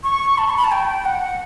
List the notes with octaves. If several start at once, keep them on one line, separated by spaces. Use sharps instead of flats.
C#6
A5
C#6
B5
A5
G5
F#5